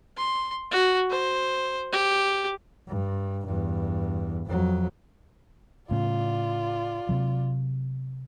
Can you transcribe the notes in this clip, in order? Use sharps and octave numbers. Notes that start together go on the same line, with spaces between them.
C6
F#4
C5
G4
G2
E2 G2
F2 F#3
A2 C#3 F4 D5
C3 F#3